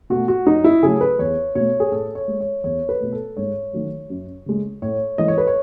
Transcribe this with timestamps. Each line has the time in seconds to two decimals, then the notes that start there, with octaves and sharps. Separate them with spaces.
0.10 B2 A3 F#4
0.28 F#4
0.46 F#2 D#4
0.64 E4
0.83 C#3 F#3 A3 G#4
1.01 B4
1.19 E2 C#5
1.55 B2 A3 C#5
1.80 G#4
1.92 A2 A4
2.15 C#5
2.28 G#3
2.40 C#5
2.64 E2 C#5
2.89 B4
3.00 B2 A3
3.12 A4
3.37 G#2 C#5
3.73 D#3 F#3 A3
4.10 F#2
4.46 C#3 G#3
4.82 A2 C#5
5.18 E3 G#3 D#5
5.28 C#5
5.38 B4
5.47 C#5